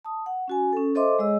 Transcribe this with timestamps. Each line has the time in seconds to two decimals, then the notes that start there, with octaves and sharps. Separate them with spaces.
0.05 A5 D#6
0.26 F#5
0.48 C#4 F#4 G#5
0.73 C#4 A4
0.95 A4 C5 D#5 E5 C6 D6
1.19 G#3 G#4 C#5 D#5 E6